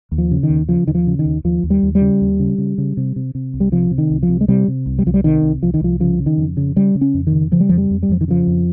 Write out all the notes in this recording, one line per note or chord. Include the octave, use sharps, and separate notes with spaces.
D#2
F3
C#3
D#3
D#2
C#3 F3
D#2 D#3
F3
C#3
D#3
D#2
D#2 F3
D#2
G3
D#2
G3
C#3
D#2
C#3
C#3
C#3
C3
C3
C3
C2
G3
C3 F3
C3
D#3
C2
F3
C3
G#3
C3 G3
C3
C2
G3
C2 F3
G3
C3 D#3
C2
C2 F3
D#3
C2 F3
C#3 F3
C#3
D#3
F2
C#3
C#3 G3
C#3
C#4
F2
D#3
C#3
C#3 F3
G3
F2 F3
G3
F2
G3
F2 F3
D#3
C#3 F3
F2